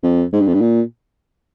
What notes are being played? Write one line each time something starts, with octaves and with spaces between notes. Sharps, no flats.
F2
G#2
G2
F2
G2
A#2